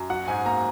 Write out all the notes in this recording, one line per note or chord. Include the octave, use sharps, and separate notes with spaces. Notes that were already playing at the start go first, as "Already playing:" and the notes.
Already playing: F#2
F#3 F#5
G#2 G#5
A#3 A#5